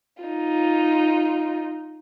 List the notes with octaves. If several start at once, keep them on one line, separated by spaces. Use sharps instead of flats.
D#4 F4